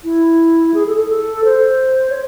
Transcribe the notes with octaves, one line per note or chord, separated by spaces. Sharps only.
E4
G#4
A4
A4
A4
C5
C#5